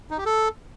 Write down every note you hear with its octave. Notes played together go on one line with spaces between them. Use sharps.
D#4
G4
A4